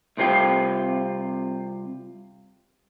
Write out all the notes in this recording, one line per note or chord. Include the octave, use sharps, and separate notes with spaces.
C2 C3 C4 F4 G5